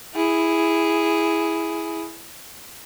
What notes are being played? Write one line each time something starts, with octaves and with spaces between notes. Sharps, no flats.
E4 G#4